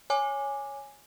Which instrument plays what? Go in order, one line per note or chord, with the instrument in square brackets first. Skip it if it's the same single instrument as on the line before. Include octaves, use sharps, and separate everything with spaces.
[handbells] C#5 G#5 D6